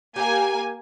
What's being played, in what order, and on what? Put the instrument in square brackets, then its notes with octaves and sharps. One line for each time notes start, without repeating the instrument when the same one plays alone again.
[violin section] A#3 G#5 [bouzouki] G4